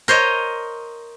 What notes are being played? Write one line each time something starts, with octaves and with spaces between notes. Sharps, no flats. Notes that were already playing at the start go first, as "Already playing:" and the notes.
A#4 C5 C#5 D#5